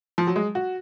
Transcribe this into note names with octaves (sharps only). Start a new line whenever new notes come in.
F3
F#3
G#3
F#4